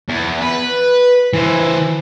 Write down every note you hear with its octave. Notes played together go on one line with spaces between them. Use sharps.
E2
B4
E3 C5